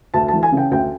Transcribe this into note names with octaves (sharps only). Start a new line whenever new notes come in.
D2 A5
A5
E3
G#5
C#3
G5
D2 G5